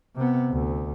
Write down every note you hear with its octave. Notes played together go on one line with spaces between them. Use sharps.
C3 B3
D2